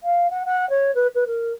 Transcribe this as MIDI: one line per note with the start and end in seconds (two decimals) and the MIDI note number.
0.03 0.30 77
0.30 0.43 78
0.46 0.68 78
0.70 0.94 73
0.95 1.07 71
1.15 1.24 71
1.27 1.52 70